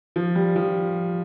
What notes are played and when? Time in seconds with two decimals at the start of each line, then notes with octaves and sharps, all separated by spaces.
0.16 F3
0.35 G3
0.56 F3